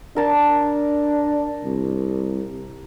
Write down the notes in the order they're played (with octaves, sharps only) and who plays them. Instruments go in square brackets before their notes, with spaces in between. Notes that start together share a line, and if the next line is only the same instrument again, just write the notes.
[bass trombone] D4 [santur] A#4 A5
[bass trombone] C2